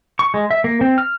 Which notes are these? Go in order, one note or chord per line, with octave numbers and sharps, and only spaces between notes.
C#6
G#3
E5
A#3
C4
F6